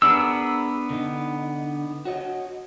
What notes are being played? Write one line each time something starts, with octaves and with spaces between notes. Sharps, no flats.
B3 D4 G#4 A#4 E6
D3 D#4
F#4 C#5 D#5